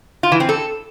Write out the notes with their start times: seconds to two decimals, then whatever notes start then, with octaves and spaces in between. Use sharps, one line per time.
0.23 F4
0.32 E3
0.40 C4
0.49 A4